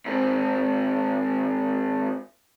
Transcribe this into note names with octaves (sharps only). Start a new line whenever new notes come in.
G#2 C4